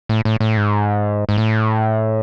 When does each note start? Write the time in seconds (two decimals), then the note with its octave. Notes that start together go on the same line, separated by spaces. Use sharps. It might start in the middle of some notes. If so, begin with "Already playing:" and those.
0.09 A2
0.25 A2
0.40 A2
0.57 G#2
1.29 G#2
1.38 A2